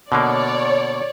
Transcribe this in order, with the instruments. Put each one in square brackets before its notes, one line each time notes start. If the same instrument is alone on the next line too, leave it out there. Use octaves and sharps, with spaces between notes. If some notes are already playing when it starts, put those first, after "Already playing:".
[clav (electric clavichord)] B2 D3 A#3 [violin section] C#5 D5